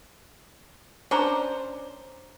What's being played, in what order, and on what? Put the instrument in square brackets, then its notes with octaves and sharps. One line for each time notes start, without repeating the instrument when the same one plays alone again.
[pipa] C#4 D4 C5 [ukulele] A5 A#5